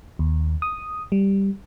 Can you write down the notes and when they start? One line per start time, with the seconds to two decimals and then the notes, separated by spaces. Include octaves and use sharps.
0.19 D#2
0.62 D#6
1.12 G3